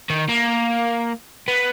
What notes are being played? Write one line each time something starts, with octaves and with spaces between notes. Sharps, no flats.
D#3
A#3
B3